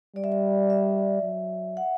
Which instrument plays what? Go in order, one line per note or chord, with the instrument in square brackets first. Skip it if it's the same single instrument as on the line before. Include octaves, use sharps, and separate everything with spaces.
[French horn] G3 [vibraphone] D5
[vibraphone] E5
D5
E5
[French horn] F#3
[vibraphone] F#5